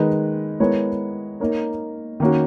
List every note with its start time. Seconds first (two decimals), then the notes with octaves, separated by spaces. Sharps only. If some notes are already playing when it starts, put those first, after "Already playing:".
Already playing: D#3 G#3 D#4 G#4 B4
0.60 G#3 B3 E4 A#4 C#5
1.40 A#3 D#4 A#4 C#5
2.20 D#3 A#3 C#4 F#4